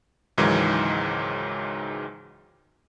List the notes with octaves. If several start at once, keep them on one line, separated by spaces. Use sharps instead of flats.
C#2 G#2 D#3 E3 F#3 G#3